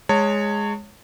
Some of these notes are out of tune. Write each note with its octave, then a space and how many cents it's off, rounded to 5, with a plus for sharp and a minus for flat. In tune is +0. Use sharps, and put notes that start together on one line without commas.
G#3 -5 C#5 +0 A5 +45